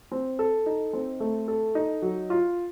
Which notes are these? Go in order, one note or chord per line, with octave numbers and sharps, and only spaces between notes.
C4
A4
D#4
C4
A3
A4
D#4
F#3
F4